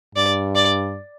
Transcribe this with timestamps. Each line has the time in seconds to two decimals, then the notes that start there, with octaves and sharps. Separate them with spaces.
0.15 G2 D5
0.55 D5